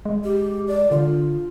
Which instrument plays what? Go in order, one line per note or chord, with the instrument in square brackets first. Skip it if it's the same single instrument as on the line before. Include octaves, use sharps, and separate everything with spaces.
[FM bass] G#3
[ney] G4
D5
[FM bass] D3 [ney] F4